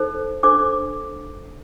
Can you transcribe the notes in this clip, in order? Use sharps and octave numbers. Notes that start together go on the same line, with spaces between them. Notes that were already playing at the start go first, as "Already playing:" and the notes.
Already playing: D#4 A4 C5
D4 A4 C5 D6